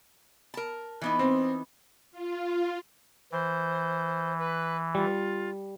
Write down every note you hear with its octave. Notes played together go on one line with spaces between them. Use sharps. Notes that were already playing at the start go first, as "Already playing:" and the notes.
A#4 A5
E3 B3 D#4
C4
F4
E3 C5
B4
G3 F4